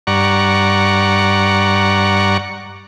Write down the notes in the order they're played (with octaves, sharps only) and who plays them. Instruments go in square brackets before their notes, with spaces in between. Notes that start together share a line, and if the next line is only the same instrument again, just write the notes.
[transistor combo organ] G2 D5 F#5 A#5 C#6